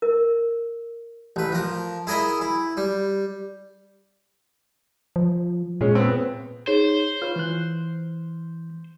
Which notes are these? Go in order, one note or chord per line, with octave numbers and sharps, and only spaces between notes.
A#4
A1 B4
F3 A#4
E4 G#4 A#4 D#5 E5
E4
G3
F3
A#2 G#3 C#4
B3 C4
D#4 G#4 C5 C#5
F4 B4 C#5 F6
E3 F#6